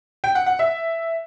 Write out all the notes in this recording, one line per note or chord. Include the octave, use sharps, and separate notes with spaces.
G5
F#5
F#5
E5